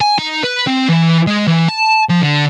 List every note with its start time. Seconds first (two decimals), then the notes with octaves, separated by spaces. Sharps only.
0.01 G#5
0.19 D#4
0.44 B4
0.67 C4
0.89 E3
1.27 G#3
1.47 E3
1.69 A5
2.10 F3
2.23 D3